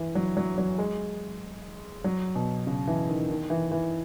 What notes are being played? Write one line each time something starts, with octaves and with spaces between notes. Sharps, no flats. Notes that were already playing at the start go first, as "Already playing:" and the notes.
Already playing: E3
F#3
F#3
F#3
G#3
F#3
B2
C#3
E3
D#3
D#3
E3
E3